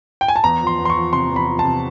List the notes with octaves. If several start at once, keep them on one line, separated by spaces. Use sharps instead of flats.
G5
G#5
A5
E2 A#5
F3
C6
E2
C6
C#6
F3
C3 C6
E2
B5
F3
A5
C3